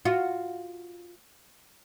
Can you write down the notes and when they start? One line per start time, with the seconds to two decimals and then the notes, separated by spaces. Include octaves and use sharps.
0.05 F4 F#4